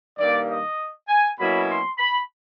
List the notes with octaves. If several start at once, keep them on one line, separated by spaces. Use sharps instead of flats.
G2 D#3 G3 A#3 D5
D#5
G#5
B2 F#3 A#3 C#4 E4 B5
C6
B5